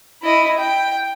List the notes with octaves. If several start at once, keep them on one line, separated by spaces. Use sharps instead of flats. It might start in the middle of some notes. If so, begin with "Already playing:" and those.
E4 D#5
G5